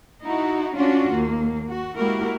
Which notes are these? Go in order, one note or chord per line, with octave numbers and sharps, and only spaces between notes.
D#4 E4 F#4
C#4 D4 F4 F#4
D#2 A#3
F#4
G#3 A#3 E4 F#4 G4 A#4